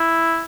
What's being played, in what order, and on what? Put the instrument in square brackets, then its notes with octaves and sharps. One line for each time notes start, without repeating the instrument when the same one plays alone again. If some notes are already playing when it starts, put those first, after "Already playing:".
Already playing: [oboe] E4